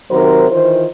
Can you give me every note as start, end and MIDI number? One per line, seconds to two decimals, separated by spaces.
0.11 0.47 48
0.11 0.47 51
0.11 0.47 54
0.11 0.47 70
0.11 0.47 72
0.52 0.87 51
0.52 0.87 52
0.52 0.87 65
0.52 0.87 72